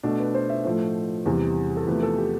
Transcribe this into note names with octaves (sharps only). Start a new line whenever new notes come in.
B2 A3 D4
B4
C5
E5
A2 F3 A3 C5
E2 C3 E3 G3
A4
E2 C3 F3 A3 B4
A4
G4